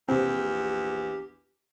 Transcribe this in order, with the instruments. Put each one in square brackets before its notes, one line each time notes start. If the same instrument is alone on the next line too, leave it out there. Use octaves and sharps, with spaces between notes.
[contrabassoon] A#1 [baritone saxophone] E2 [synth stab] C3 C4 [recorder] G4